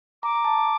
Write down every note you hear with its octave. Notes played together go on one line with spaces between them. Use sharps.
A#5 D6
A#5
A5